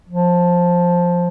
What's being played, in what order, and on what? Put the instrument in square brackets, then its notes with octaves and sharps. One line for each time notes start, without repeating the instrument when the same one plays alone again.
[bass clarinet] F3